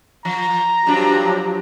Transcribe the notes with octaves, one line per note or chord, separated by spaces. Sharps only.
F3 A#5
G2 F3 F#3 D4 G4